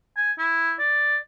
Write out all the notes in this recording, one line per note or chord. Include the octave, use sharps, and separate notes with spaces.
G#5
E4
D5